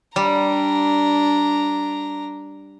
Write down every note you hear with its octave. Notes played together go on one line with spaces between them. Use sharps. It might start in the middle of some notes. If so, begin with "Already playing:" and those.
G3 D4 A#5